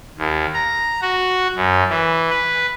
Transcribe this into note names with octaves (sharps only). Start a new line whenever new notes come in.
D#2
A#5
F#4
F#2
E3
B4